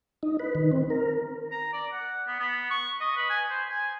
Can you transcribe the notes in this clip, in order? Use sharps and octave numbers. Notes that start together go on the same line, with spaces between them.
D#4
B4
D#3
C4
A#4
A#5
D5
F#5
B3
B3
C#6
D#5
B4
G#5
C5
G#5